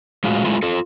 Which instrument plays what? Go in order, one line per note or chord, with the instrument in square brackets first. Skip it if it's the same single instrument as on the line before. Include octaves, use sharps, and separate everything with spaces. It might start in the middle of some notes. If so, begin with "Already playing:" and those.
[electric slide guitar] A2 G#3 F4 F#4
G#3 A3 E4 F4
F4 A4